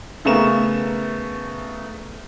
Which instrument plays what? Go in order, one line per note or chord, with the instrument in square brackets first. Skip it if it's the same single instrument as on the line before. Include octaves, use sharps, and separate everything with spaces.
[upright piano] C#3 A3 B3 A#4 C#6 E7